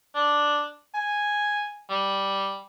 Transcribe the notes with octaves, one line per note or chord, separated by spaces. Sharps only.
D4
G#5
G3